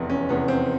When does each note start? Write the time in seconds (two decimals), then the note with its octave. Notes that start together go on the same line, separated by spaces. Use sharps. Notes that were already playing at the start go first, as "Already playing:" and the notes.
Already playing: F1 E2 C3
0.10 C#4
0.29 F1 E2 C3 B3
0.48 C4